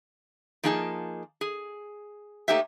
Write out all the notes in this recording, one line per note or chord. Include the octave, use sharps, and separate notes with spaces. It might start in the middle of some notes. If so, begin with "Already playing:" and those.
F3 A#3 D#4 G#4 F5 A5
G#4
A3 A#3 D#4 G4 C5 E5